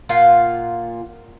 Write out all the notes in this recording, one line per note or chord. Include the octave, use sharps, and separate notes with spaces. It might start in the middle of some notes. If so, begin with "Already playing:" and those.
A#2 F4 F5 F#5